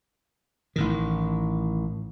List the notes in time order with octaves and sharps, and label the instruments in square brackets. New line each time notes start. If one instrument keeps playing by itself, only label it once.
[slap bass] A1 A2 D#3